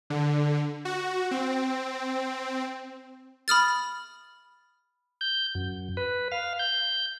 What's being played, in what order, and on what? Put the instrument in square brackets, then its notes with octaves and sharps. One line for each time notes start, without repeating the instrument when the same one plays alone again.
[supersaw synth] D3
F#4
C4
[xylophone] B5 D#6 F6 A6
[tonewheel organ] G6
F#2
B4
F5
G6